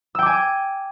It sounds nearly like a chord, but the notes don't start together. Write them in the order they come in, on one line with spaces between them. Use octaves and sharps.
E6 G5 D6 G#5